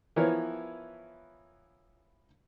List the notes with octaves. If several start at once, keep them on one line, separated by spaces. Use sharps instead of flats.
E3 F3 B3 E4 A#4 C#5